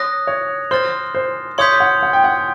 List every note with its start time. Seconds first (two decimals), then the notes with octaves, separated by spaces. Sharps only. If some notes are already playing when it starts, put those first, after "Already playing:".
Already playing: C#5 D#6 F#6 A#6
0.27 C#5
0.71 C5 C6 F6 A6
1.15 C5
1.58 C#5 C6 D#6 G6 B6
1.80 F#5
2.03 F#5
2.13 G5
2.24 F#5